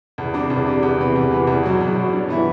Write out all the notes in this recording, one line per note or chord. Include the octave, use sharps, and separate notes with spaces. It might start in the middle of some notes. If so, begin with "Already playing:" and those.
E2
C3 G3 D4
E2
C3 G3 D4
E2
C3 E3 B3
E2
C3 E3 B3
E2
B2 F#3
E2
B2 F#3
G2
E3 B3 E4